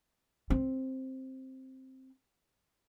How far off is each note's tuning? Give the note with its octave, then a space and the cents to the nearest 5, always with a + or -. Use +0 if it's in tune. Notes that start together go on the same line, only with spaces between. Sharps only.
C4 +5